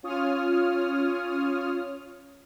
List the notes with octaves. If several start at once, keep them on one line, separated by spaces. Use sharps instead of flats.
C#4 F4 C#5 D#6 F6